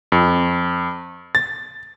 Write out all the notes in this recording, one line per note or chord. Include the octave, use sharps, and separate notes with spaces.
F2
A6